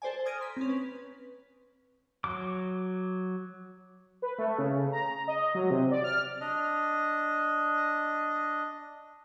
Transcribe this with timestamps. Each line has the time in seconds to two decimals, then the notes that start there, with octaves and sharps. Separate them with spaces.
0.02 A4 C5 D5 G#5
0.26 D#6 F6 G#6 A#6 D7 D#7
0.39 A#5 C6 B6
0.57 C4 C#4
0.69 B4
2.24 F#3 D6
4.22 B4
4.39 A3
4.58 C#3
4.92 A#5
5.28 D#5
5.55 F#3
5.70 C3
5.91 D5
6.04 F6
6.41 D4 D#5